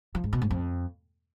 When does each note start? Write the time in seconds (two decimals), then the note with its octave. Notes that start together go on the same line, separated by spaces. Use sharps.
0.15 F3
0.24 G#2
0.33 B2
0.42 G#2
0.51 F2